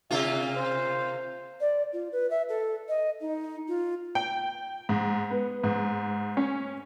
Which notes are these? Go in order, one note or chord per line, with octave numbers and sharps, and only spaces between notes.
C3 A#3 F4 E5
C5
D5
F4
B4
E5
A4
D#5
D#4
F4
G5
G#2
B3
G#2
C#4